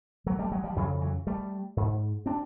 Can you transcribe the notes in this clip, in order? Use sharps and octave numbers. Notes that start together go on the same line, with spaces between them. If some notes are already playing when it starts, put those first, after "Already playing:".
F#3 G#3
G3 A3
F#3 G#3
F3 G3
F2 C#3 E3 F#3
E3 F#3
G3 A3
G#2
C4 D4